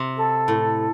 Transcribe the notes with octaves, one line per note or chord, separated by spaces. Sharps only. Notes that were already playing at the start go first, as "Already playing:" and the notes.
Already playing: C3
A4
A2